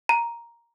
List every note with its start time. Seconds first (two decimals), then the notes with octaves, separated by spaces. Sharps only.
0.09 A#5